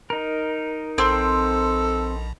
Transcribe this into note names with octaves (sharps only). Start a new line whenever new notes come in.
D#4 A#4
A#1 C4 A4